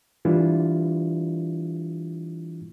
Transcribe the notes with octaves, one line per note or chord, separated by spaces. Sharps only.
E3 G3 D4 E4 F4